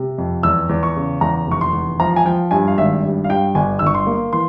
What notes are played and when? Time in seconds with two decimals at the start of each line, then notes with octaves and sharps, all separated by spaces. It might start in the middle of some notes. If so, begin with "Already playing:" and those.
Already playing: C3
0.18 F2
0.43 E2 E6
0.69 E2
0.83 C#6
0.96 C#3
1.21 E2 A#5
1.47 F1 C#6
1.61 C6
1.73 E2
2.00 F3 A#5
2.16 G#5
2.25 F3 G5
2.51 G2 G#5
2.67 F5
2.77 G#1 E5
3.03 G2
3.24 F5
3.29 G2 G5
3.55 G1 G#5
3.79 E6
3.82 G1 C#6
3.95 C6
4.07 A#3
4.33 E3 C6